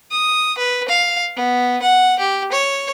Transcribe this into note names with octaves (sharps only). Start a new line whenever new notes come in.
D#6
B4
F5
B3
F#5
G4
C#5